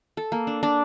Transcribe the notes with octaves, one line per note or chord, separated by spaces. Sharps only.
A4
A#3
D4
D4